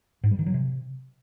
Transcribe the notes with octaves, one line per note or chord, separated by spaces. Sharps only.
G#2
G3
D#3
F#3
C3